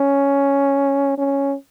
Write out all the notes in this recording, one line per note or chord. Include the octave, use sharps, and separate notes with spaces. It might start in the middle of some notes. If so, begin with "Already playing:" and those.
Already playing: C#4
C#4